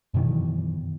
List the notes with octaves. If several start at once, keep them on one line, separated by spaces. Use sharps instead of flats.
F#2 B2 D#3 E3